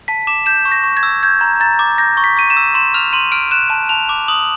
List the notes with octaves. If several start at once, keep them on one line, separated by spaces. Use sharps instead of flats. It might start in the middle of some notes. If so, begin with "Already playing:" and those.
A5 B6
D6 E7
G6 E7
C#6
A#6
C#6
G#6
E6
G6 G#6
A#5
A#5 A6
D6
G6 A#6
C#6
B6
C#6 D#7
E7
E6
C6 E7
F6 F7
C6 D#7
F6 D7
F#6 E7
A5
A5 F7
D6
D#6 F#7